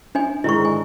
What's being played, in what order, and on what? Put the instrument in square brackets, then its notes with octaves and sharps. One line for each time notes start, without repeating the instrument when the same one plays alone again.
[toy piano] D4 D#4 G#5
[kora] G#2 D3 D#3 [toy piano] E4 C#6
[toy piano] G#5